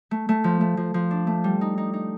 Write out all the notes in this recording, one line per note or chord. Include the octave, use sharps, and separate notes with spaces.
A3
A3
F3
A3
F3
F3
D4
A3
G3
D#4
D#4
D#4